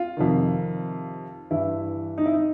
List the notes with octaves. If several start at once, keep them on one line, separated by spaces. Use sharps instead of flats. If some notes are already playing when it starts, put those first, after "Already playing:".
Already playing: F4
F2 C3 D#3
G2 E3 E4
D#4
E4
D#4